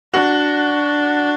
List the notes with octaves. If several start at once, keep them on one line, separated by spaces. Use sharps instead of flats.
D4 F#4